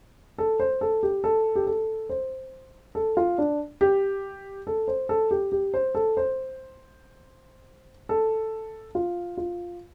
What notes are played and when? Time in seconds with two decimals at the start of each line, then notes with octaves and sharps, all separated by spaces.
0.38 A4
0.60 C5
0.81 A4
1.03 G4
1.24 A4
1.56 G4
1.67 A4
2.09 C5
2.95 A4
3.17 F4
3.38 D4
3.81 G4
4.67 A4
4.88 C5
5.09 A4
5.31 G4
5.52 G4
5.74 C5
5.95 A4
6.17 C5
8.09 A4
8.95 F4
9.37 F4